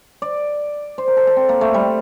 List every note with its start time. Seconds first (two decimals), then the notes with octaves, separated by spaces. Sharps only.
0.22 D5
0.98 C5
1.08 A#4
1.17 A4
1.27 A4
1.37 C4
1.49 A#3
1.61 A3
1.74 G3